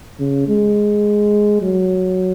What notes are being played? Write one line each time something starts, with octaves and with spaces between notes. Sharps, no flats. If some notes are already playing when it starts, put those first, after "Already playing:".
C#3
G#3
F#3